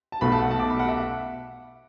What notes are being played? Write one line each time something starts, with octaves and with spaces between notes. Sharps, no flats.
A5
B1 B2 A3 B5
A5
F#5
A5
D6
B5
F#5
E5